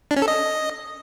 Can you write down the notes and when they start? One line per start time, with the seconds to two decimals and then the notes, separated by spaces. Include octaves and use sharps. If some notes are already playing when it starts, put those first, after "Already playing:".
0.11 D4
0.16 C#4
0.22 A4
0.28 D#5